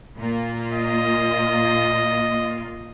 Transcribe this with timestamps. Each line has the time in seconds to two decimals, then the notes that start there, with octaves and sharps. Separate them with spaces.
0.18 A#2 A#3 F4
0.73 D#5